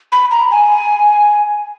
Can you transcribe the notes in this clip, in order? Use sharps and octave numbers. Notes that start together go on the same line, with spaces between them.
B5
A#5
G#5